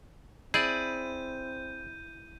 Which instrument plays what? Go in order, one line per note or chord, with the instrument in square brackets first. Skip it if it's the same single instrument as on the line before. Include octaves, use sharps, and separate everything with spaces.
[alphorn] C4 [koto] E4 [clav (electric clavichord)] G#4 D5 [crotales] G6 D#7